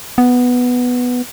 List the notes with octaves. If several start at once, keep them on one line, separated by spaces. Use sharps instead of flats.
B3